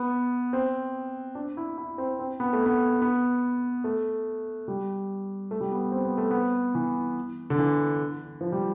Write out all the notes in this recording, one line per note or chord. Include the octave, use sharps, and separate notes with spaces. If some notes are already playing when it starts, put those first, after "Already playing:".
Already playing: B3
C4
D4
E4
E4
C4
C4
B3
A3
B3
B3
A3
G3
A3
G3
B3
C4
B3
A3
B3
E3
D3
E3
F3
G3